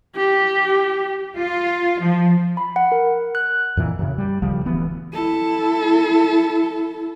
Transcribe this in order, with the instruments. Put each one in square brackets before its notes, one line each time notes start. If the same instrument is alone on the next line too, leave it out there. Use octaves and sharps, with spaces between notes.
[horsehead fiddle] G4
[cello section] F4
F3
[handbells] B5
F#5
A#4
F#6
[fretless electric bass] F2 A#2 E3
F#2 C#3
G3
D2 C#3 F3 G3
D1 D2 E3 B3
[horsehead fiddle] E4 A4